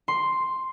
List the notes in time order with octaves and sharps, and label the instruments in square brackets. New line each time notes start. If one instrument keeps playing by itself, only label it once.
[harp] C6